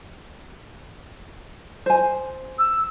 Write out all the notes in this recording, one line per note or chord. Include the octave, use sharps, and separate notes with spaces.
C5 G#5
E6